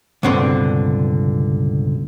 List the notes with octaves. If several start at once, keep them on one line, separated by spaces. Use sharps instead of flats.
C#2 G2 B2 D3 C4